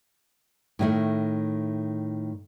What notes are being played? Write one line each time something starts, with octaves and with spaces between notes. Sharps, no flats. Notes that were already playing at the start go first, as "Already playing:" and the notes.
A2 D#3 A3